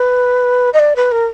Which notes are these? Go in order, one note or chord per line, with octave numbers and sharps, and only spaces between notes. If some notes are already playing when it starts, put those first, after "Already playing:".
Already playing: B4
D#5
D5
B4
A#4